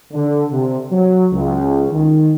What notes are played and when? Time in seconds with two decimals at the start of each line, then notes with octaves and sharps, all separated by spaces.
0.13 D3
0.52 C3
0.90 F#3
1.33 C#2
1.92 D#3